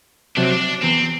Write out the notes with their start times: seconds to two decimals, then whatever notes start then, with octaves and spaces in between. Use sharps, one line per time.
0.37 C3 F#3 D4
0.45 C4
0.51 D4
0.83 E2 C4